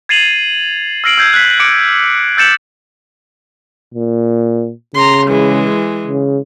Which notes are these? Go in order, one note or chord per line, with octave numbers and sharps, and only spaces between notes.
G#6 A6 C7 D#7 F7 F#7
E6 F6 A#6 C7 D7 F#7
E6 G6 G#6 C7
F#6 B6
D6 C#7 D7
E6 G6 A6 C#7 E7 F#7
A#2
C#3 A#5 C6
E3 G#3
C#3